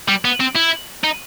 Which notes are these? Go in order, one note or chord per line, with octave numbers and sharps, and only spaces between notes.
G3
B3
C4
E4
D#4